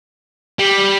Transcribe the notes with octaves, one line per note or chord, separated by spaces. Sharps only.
G3